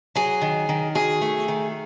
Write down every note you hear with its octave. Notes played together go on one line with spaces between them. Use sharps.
F#3 G#4
D#3
D#3
F#3 G#4
A3
D#3